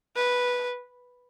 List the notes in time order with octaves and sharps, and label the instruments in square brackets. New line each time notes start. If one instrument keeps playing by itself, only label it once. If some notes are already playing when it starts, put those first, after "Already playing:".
[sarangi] B4